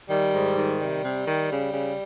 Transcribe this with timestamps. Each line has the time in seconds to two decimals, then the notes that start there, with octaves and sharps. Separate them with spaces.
0.09 D#3 G3
0.34 G#2
0.57 D#3
0.80 C3 G3
1.03 C3
1.27 D#3
1.50 C#3
1.73 C#3